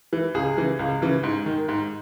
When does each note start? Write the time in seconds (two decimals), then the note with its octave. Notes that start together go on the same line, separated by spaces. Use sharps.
0.13 E3
0.34 C#2 G#4
0.57 C#3 E3
0.79 C#2
1.02 C#3 E3
1.23 G#2
1.46 D#3
1.68 G#2